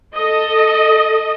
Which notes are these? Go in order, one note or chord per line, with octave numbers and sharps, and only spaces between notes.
A4 D#5